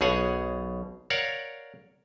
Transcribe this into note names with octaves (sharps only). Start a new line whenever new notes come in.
B1 B2 G#4 C#5 F#5
A#4 C#5 D5 F5 F#5